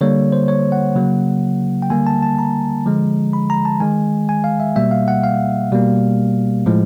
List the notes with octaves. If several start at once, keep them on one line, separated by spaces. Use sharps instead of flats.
D3 G3 A#3 C#5
C5
C#5
F#5
C#3 F#3 A#3
G5
D3 G3 A#3 G#5
A5
A5
A#5
D3 F3 G#3
B5
A#5
A5
D#3 G#3 G#5
G#5
F5
E5
B2 G3 A#3 E5
F5
F#5
F5
B2 G3 A#3
A2 F3 G#3